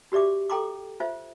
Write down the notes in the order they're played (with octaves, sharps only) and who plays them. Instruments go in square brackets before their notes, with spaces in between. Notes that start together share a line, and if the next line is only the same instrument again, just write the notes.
[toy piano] F#4 G4 D5 E5 D6
A4 G5 A#5 C6 D6
F4 C5 E5